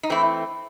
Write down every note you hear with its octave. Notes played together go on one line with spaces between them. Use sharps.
D#4
E3 A3 C4 E4